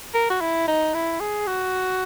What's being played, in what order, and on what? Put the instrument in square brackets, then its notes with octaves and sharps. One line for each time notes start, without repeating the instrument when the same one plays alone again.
[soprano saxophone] A#4
F#4
E4
D#4
E4
G#4
F#4